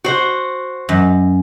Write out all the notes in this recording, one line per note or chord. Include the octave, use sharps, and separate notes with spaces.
F#4 C5
F#2